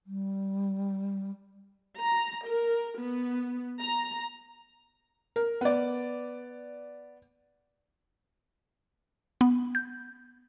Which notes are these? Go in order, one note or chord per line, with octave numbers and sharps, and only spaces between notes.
G3
A#5
A#4
B3
A#5
A#4
B3 D5
B3
G6